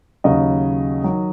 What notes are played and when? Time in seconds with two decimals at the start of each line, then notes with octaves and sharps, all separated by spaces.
0.24 D#2 C#3 F#3 D#5
1.04 D#3 F#3